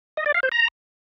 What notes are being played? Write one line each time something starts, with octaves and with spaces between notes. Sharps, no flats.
D#5
D5
F5
C5
A#5